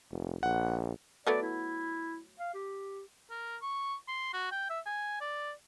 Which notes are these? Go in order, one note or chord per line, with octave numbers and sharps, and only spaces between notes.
F1
A#1 F#5
F#3 A3 B3 D5
E4
F5
G4
A#4
C#6
C6
F#4
G5
E5
G#5
D5